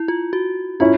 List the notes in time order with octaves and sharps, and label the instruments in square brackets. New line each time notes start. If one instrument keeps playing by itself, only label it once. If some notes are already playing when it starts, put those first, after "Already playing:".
Already playing: [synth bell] E4
F4
F#4
[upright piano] C#4 E4 [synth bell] F4